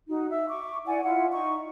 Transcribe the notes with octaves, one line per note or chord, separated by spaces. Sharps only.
D#4 F#4
E5 E6
C#6 D6
E4 D5 F#5 G#5
E4 F4 F#5
D#4 C#6